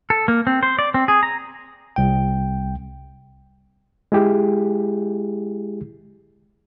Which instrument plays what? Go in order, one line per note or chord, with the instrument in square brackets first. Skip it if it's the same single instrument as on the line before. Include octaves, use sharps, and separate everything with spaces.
[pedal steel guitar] A4
A#3
C4
C5
D5
C4
G#4
A#5
[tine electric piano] C2 G5
[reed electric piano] G#3 E4 G4 G#4